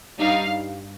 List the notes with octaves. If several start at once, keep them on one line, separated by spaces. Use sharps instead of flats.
G2 G3 D#4 F5